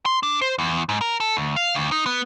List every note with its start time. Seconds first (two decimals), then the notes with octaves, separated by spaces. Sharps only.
0.06 C6
0.23 D4
0.42 C5
0.59 E2
0.89 G#2
1.01 A#4
1.20 A4
1.37 D2
1.56 F5
1.75 D2
1.92 D#4
2.06 B3